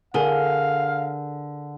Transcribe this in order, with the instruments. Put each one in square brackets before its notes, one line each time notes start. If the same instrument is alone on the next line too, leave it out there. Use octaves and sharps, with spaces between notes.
[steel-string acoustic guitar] D3 [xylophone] G#4 A#4 G#5 [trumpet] F5